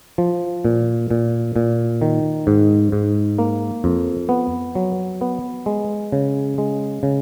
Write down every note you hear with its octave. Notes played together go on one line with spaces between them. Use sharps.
F3
A#2
A#2
A#2
D#3
G#2
G#2
A#3
F2
B3
F#3
B3
G#3
C#3
G#3
C#3